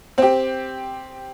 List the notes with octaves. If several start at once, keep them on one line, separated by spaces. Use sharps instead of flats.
C4 G4